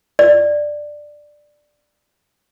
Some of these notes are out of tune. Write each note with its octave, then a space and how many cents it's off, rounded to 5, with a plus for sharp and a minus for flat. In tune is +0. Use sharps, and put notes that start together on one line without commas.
D5 +10